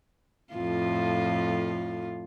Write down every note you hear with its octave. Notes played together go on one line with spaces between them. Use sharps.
F2 A2 F4